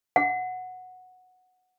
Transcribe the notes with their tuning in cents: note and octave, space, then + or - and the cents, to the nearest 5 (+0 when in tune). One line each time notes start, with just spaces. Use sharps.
F#5 -10